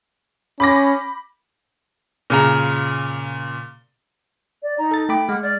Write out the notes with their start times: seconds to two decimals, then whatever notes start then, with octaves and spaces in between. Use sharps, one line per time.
0.60 C#4 B5 D6 A#6
2.30 A#2 C#3 A#5
4.63 D5
4.78 D#4 A#5
4.91 A4 A6
5.09 A3 G5 B5 D6
5.29 G#3 F#5 F6
5.42 D5